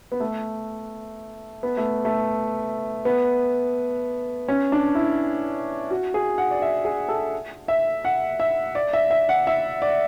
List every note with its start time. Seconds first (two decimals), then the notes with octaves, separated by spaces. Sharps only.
0.12 B3
0.20 A3
1.63 B3
1.77 A3
2.05 A3
3.05 B3
4.48 C#4
4.72 D4
4.95 E4
5.90 F#4
6.14 G#4
6.38 F#5
6.51 D5
6.62 E5
6.85 G#4
7.09 A4
7.68 E5
8.05 F#5
8.40 E5
8.75 D5
8.93 E5
9.11 E5
9.29 F#5
9.47 E5
9.82 D5